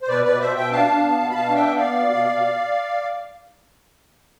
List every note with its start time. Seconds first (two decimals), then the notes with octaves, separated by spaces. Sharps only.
0.02 C5
0.08 B2 B4 D5
0.24 B2 B4 D5
0.40 B2 C5 E5
0.56 B2 E5 G5
0.71 D4 F5 A5
0.87 D4
1.03 B3
1.18 B2
1.30 B5
1.34 B2 F5 A5
1.50 D4
1.55 E5 G5
1.66 B3
1.76 D5 F5
1.82 B3
1.98 B2
2.13 B2
2.29 B2